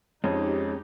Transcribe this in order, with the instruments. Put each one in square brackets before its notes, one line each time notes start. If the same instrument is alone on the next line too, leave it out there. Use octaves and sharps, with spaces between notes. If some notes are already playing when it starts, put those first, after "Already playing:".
[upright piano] F2 [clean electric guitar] G#3 C#4 [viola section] D#4 G4